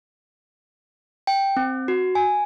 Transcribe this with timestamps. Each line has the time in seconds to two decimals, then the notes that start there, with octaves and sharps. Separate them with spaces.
1.27 G5
1.57 C4
1.88 F#4
2.15 G#5